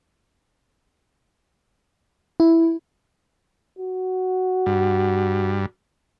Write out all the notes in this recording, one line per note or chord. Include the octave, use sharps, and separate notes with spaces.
E4
F#4
G2